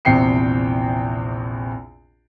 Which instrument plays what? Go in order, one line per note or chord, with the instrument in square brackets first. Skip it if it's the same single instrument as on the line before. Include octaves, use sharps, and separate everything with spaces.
[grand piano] A#1 E2 C3 G5 C7 C#7